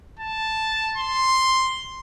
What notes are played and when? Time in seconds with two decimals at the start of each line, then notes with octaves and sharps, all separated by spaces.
0.19 A5
0.97 C6